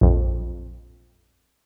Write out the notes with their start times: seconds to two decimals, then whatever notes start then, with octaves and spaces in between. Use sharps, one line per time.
0.01 A#1 F2